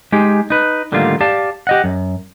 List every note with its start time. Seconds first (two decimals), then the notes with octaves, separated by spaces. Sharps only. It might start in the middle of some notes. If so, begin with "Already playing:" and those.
0.12 G#3 D#4 G4 G#4
0.50 D#4 B4
0.92 A2 D3 D#3 G3 A#3 F4
1.21 G4 D5 F5 A5
1.67 G4 D#5 F#5
1.84 F#2